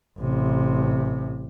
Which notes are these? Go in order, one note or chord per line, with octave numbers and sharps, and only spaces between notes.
A1 C3